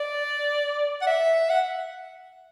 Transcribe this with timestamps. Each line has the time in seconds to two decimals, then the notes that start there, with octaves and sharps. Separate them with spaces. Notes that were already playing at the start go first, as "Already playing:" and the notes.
Already playing: D5
1.01 F#5
1.07 E5
1.50 F#5